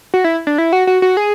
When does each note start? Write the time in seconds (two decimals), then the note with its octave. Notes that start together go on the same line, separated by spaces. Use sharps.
0.14 F#4
0.24 E4
0.47 D4
0.58 E4
0.73 F#4
0.87 F#4
1.02 F#4
1.17 G#4